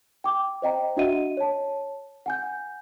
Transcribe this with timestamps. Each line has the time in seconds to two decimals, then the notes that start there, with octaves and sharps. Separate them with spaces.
0.24 G5 D6
0.62 C5 D#5 G5 A#5
0.97 D4 F#4 D#5 E5 F#5 D#7
1.37 C#5 A5
2.26 F#5 G#5 G6